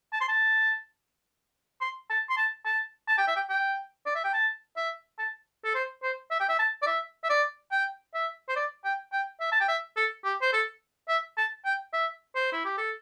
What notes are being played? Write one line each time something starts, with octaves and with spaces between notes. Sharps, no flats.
A5
C6
A5
C6
A5
C6
A5
A5
A5
G5
E5
G5
G5
D5
E5
G5
A5
E5
A5
A4
C5
C5
E5
G5
E5
A5
D5
E5
E5
D5
G5
E5
C5
D5
G5
G5
E5
A5
G5
E5
A4
G4
C5
A4
E5
A5
G5
E5
C5
E4
G4
A4